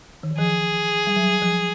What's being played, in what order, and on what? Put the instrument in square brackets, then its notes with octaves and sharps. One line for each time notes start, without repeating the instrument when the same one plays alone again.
[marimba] D#3
E3
[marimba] F3 [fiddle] G#4
[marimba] G3
F#3
F3